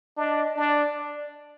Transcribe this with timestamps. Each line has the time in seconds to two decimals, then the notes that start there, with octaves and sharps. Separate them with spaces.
0.17 D4 D#5
0.56 D4 D5